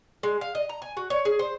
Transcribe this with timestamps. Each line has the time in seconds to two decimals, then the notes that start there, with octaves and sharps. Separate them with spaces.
0.23 G#3
0.41 F5
0.55 D#5
0.69 A#5
0.82 G#5
0.97 F#4
1.10 C#5
1.25 G#4
1.39 C5